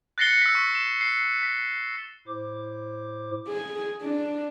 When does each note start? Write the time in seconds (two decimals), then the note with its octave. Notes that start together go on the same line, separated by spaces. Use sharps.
0.18 F#6 A6 A#6 C7 C#7 G7
0.42 E6 B6
0.55 C#6
0.75 E7
1.01 C7
1.43 B6
2.28 A2 E4 C5 D6
3.48 G#4
4.02 D4